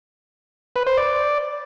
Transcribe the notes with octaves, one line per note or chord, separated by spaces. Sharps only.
B4
C5
D5